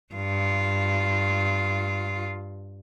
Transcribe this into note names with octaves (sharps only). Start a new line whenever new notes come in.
G2 F4